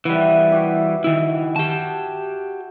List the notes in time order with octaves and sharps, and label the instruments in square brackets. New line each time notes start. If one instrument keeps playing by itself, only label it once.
[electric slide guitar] E3 G3 [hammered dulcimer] E4 F#5
[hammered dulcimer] F#4 G4 E5
[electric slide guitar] D#3 E4
[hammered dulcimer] F#4 [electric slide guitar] G4 A5